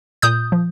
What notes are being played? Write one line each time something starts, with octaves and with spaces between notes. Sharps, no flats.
A#2 D#6 G6
F3